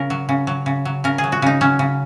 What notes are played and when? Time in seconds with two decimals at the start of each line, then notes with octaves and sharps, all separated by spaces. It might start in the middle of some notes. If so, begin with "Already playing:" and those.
Already playing: C#3 A#4
0.10 F#3
0.29 C#3
0.47 F#3
0.66 C#3
0.85 F#3
1.04 C#3 A#4
1.18 G#4
1.24 F#3
1.32 F#4
1.42 C#3 D#4
1.61 F#3 C#4
1.79 C#3